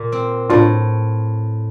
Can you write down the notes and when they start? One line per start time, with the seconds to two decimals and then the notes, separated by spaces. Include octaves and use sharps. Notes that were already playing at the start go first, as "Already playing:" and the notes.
Already playing: A#2
0.12 C4
0.50 A2 D4 F4